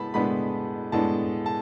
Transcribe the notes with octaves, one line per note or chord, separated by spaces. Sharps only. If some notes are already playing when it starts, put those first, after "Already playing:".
Already playing: A2 G#3 B3 A5 B5
A2 G#3 B3 D4 B5
A2 G#3 B3 D4 A5
A5